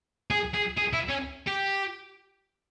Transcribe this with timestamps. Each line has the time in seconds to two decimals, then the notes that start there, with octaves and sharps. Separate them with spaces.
0.31 G#4
0.54 G#4
0.78 G#4
0.93 E4
1.09 C#4
1.47 G4